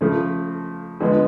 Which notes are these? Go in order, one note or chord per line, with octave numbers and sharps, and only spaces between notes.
C#3 F3 A3
D3 F3 G#3 B3